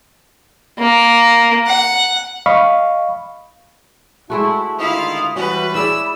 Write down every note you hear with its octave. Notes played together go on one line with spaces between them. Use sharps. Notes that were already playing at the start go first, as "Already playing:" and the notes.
A#3
F#5
D#5 F5 B5 C#6
G#3 A3 E4 F#4 A5
D3 D#3 E4 F4 F5 D#6
E3 G3 C#4 F#4 B4
E4 G#4 D5 B5 E6